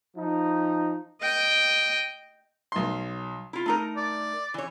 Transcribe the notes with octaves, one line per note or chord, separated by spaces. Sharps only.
F3 D#4
D#5 G5
B1 C6
E4 F4
A3 D#4 A#4
D5
E3 C#5